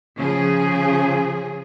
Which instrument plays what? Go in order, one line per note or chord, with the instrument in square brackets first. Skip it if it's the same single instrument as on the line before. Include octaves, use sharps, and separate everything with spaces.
[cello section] C#3 F3 G#4